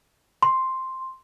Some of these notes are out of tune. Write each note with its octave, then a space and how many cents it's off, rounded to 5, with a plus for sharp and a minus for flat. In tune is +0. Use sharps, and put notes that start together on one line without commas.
C6 +0